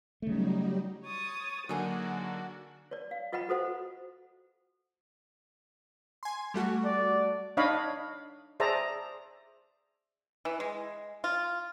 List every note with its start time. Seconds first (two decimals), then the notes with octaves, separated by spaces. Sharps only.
0.22 C#3 F#3 G3 A3 D#4
1.05 C#5 D#6 A6
1.69 D3 F#3 A#3 D4 D#4 F#4 G#4 D#5
2.91 C#5 D5
3.11 F5
3.32 F4 D#5 F#5 G5 B5
3.49 F#4 A4 C5 F#5
6.23 G#5 C6
6.54 G3 A3 F#4
6.85 D5
7.57 D4 D#4 C#5 D#5 F5 B5
8.60 G#4 C5 D5 E5 A5 A#5
10.45 E3
10.60 G#3
11.24 F4